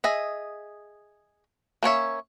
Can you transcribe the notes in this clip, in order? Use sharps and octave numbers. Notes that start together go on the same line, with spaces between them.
G#4 D#5 E5
A#3 C#4 C#5 E5